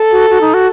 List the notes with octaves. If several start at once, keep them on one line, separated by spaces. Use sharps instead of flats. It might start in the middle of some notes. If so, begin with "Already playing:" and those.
Already playing: A4
F#4
F#4
D#4
F#4